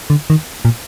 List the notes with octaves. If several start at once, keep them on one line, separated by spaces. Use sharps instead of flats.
D3
D#3
A#2